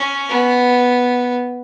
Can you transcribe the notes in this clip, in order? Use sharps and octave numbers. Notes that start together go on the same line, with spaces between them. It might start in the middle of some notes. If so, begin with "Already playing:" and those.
Already playing: C#4
B3